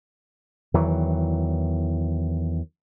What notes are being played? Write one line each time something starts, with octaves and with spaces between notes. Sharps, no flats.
E2 D#3 E3 F#3